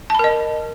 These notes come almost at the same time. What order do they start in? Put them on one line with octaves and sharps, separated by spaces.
A5 B5 A#4 D#5